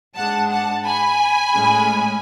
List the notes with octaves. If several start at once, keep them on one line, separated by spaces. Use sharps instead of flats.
G#2 G#3 D4 F#5 A5
F#5 A5
G#5 B5
A2 G#3 C#4